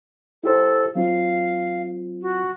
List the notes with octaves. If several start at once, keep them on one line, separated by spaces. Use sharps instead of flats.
E4 G4 A4 C5
F#3 C4 F4 F5
F#4